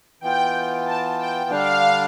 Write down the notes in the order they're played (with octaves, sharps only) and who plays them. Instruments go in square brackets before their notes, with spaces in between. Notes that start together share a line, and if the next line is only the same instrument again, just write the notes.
[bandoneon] E3 B3 F4 [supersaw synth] G5
[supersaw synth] A5
G5
[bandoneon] D3 G3 D4 [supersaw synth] F5